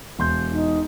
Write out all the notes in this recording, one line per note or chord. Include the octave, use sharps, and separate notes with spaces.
E1 C6 G6
D#4